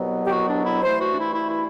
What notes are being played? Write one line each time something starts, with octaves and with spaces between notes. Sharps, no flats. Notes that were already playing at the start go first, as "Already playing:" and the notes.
Already playing: C2 B2 F#3 B3
G4
F#4
D4
E4
G2 E3 A3 C5
F#4
D4
E4
E4
E4